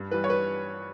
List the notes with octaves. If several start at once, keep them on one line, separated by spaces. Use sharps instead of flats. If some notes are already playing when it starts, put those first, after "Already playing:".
Already playing: G2
E3 G3 B4
C#5
B4